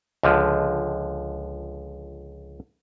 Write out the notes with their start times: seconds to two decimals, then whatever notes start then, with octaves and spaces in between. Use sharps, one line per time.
0.23 C#2 D3 F3